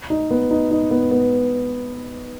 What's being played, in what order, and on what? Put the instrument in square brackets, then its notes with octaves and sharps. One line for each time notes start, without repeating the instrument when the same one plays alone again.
[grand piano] D#4
B3
D#4
D#4
B3
B3